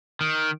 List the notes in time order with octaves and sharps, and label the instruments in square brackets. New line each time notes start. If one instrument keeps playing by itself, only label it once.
[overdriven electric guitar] D#3